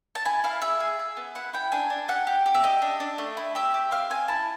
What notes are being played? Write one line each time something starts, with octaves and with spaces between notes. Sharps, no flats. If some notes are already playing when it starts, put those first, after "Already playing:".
A5
E4 G#5
E4 F5
G#4 E5
G#4
G#4
B3
E4 F#5
E4 G5
D4 G#5
D4
G4 F#5
G4
G4
E5
G4 D#5
D4
D4
A3
E4
G4 E5
G4
C4 F5
C4 G#5
E4 A5